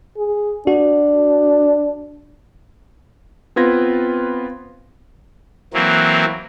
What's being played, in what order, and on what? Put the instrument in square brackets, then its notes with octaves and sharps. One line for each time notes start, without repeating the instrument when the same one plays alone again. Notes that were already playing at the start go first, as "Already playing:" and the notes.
[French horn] G#4
[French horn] D4 [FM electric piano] F#4
[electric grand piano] B3 C4 F4 B4 G#6 A#6
[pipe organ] E3 F#3 A#3 C4